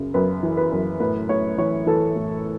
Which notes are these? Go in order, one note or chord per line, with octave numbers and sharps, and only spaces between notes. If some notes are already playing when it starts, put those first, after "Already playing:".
Already playing: F#2 C#3
F#2 B4
E3
B4
F#2
A2 B4
A2 C#5
E3 C#5
E3 A4
A2